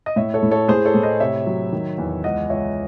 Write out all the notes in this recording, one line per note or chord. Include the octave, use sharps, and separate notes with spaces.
D#5
A2 C#5 E5
A4 C#5
A2
A4 C#5
A2 G#4 C5
A4 C#5
A2
C5 D#5
C3 C#5 E5
F#3
D#3
E2
C#2 D#5 F#5
C#2 C#5 E5